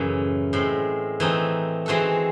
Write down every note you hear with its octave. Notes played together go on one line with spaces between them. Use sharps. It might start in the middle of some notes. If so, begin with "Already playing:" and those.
Already playing: F#2 A2 C#3 E3
A2 G#3 C4
E3 A3 C4 D#4
E3 G#3 C4 F#4 A4